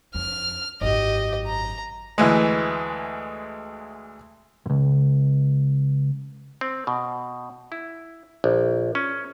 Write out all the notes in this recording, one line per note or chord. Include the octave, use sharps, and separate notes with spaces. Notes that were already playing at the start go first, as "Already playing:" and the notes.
F2 F6
G#1 F#2 G4 D#5
A#5
D2 E3 G#3
C#2 F#2
C4
B2
E4
A#1
C#4